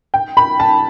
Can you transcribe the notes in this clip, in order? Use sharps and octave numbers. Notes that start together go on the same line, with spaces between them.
G5
B5
A5